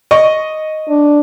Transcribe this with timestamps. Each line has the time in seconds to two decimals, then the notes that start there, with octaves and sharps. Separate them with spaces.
0.11 D#5 C#6
0.89 D4